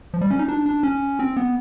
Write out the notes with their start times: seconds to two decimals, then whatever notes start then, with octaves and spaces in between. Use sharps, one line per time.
0.14 F3
0.21 G3
0.31 C#4
0.39 D#4
0.48 D4
0.66 D4
0.83 C#4
1.19 C4
1.37 B3